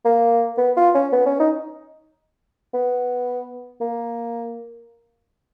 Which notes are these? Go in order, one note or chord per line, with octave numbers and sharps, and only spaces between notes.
A#3
B3
F4
C#4
B3
C#4
D#4
B3
A#3